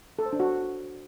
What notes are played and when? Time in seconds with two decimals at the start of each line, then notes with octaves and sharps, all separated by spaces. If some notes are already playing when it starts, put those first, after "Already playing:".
0.19 A4
0.26 C5
0.33 D4
0.40 F#4